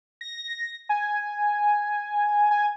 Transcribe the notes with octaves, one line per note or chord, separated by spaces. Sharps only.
A#6
G#5
G#5